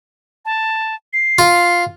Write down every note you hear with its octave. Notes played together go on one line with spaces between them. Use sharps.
A5
C7
F4